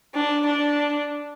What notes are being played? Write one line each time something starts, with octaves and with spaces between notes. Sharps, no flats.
D4
D4